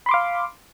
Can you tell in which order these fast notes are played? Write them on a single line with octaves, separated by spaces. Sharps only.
B5 C6 D6 F5